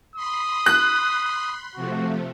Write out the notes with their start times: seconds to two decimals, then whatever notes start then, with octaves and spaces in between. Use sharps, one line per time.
0.16 B5 C6 D#6
0.66 F#6
1.76 C3 F3 A3 F#4